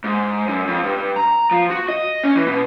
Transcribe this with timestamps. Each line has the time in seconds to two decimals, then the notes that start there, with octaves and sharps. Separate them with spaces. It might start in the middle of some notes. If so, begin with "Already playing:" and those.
0.04 G#2
0.47 F#2
0.67 F2
0.84 G2
1.16 A#5
1.51 F3
1.70 F#4
1.88 D#5
2.24 C#4
2.35 E3
2.47 B2